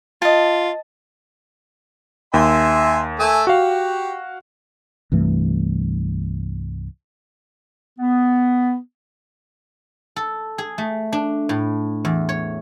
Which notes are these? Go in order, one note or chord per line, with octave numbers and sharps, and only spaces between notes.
F4 D#5 A5
D#2 E5 G#5 C6
A3 G#5 E6
F#4 G4 F5
C2 G2 E3 A3
B3
A4
G#4
A3
D4
A2
E2
C#5